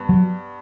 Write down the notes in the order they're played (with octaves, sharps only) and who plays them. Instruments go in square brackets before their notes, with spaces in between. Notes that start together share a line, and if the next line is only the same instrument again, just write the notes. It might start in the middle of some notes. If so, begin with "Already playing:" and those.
Already playing: [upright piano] G2 B3
[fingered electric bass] F#3